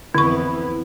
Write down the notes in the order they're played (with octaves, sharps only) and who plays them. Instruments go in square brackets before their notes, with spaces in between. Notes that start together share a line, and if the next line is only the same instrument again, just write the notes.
[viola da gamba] F2 E3 B3 [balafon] D3 C#6 [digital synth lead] E4